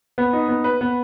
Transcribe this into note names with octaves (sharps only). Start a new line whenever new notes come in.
B3
D#4
B3
B4
B3